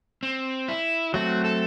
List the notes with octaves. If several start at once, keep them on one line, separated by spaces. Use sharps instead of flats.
C4
E4
F#3 A3 C4 F#4
A4